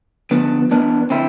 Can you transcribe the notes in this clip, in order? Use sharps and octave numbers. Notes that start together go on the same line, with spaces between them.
D3 F3 B3
E2 B3 D4
D3 C4 E4